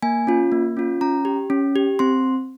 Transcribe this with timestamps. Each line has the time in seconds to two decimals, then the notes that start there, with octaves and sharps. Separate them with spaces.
0.03 A#3 G#5
0.27 C#4 F4
0.52 A#3
0.77 C#4 F4
1.01 C#4 A#5
1.25 G4
1.50 C#4
1.76 G4
1.99 C4 C6